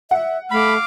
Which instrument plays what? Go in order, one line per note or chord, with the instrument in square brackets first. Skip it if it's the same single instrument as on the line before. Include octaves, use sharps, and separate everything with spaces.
[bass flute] E5 [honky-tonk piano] F#5
[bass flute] A3 [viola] F5 D6 [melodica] B5